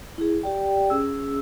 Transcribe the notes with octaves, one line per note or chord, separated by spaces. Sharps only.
E4 G#4
G4 D5 G5
C#4 G#4 E6